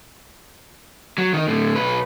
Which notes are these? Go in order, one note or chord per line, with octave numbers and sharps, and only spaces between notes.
F#3
D#3 D#4
A2 D3
B1 B4